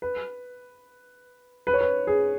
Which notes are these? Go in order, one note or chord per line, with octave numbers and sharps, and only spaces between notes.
B4
B4
C#5
B4
G#4